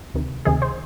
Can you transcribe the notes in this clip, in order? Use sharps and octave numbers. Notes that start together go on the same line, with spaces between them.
D2 C3 D#3
D2 C3 D#3 G#4
C5